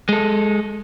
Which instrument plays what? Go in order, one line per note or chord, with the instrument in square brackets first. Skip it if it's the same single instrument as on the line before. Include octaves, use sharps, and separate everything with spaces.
[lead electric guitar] G#3 A4